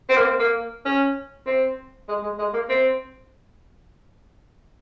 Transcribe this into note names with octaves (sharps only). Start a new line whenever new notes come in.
C4
A#3
C4
A#3
C#4
C4
G#3
G#3
G#3
A#3
C4